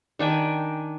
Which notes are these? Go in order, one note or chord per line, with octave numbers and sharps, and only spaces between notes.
D#3 D4 G5 G#5